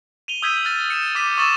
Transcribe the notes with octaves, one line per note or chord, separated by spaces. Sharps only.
D#7 F7 G7
D#6 E6 G6 G#6 B6 D#7
F6 A6 G7
C#7 E7
D6 F6 G6 B6 D#7
C#6 D#6 E6 A6 E7 F#7